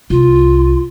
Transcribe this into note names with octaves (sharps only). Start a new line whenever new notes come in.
C2 F4